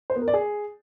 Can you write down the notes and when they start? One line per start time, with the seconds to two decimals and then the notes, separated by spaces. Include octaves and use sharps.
0.10 C5
0.16 B3
0.22 A#4
0.28 D5
0.34 G#4